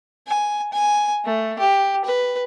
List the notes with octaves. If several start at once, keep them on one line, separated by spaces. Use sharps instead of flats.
G#5
G#5
A3
G4
B4